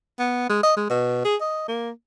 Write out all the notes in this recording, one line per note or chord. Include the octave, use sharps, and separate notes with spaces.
B3
G#3
D#5
G#3
B2
G#4
D#5
A#3